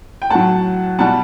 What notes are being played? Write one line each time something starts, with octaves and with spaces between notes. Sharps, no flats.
G5
A2 F#3 F#5 A5
B2 G3 F#5 A5